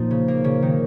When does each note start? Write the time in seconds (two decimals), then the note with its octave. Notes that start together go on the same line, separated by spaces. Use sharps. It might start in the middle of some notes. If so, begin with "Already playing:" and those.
Already playing: A#2 F3 D#4
0.11 C#3
0.28 A#3
0.44 C#3
0.62 D#3